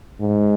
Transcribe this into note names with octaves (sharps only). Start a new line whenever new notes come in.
G#2